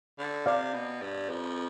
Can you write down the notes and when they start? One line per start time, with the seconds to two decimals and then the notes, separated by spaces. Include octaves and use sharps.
0.19 D3
0.46 C3 D5 F5
0.74 B2
1.02 G2
1.29 F2